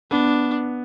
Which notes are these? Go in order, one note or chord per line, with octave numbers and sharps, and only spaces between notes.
B3 D4